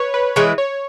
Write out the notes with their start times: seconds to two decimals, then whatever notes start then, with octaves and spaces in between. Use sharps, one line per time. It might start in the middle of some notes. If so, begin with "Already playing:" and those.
Already playing: B4 C#5
0.14 B4
0.36 E3 G#3 E4 B4 C#5
0.58 C#5